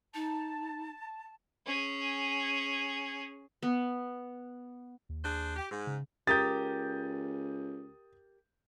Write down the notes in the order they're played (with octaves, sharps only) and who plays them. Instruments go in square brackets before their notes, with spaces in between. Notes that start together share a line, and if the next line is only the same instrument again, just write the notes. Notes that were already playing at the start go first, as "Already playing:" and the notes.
[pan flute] D#4 [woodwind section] A5
[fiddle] C#4 G#4
[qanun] B3
[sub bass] D#2
[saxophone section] D4 G#4 C5
G4
G#2
[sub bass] C#3
[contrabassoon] C#2 [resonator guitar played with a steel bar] G4 A#4 [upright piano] D#6 G6 [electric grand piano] A6